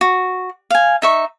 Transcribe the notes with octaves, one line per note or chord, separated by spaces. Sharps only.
F#4
F5 G#5
D#4 E5 C#6